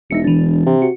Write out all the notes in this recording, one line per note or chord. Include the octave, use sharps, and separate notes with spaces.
E1 D#4 E5 C#7
E3 D4
C3
F#4